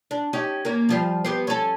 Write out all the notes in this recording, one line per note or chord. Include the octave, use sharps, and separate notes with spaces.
D4
C#4 D#4 G4
A#3 C#4
F3 G3 C5
B3 G4 C5
C#4 A4